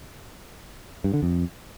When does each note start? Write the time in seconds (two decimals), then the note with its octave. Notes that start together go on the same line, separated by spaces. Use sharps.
1.04 G2
1.14 D3
1.23 F2